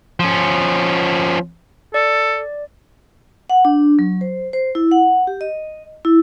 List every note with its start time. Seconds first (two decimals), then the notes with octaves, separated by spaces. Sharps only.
0.20 F3 C#4
1.94 A4 D5
3.50 F#5
3.65 D4
3.99 F#3
4.21 C5
4.53 C5
4.75 E4
4.92 F#5
5.27 G4
5.41 D#5
6.05 E4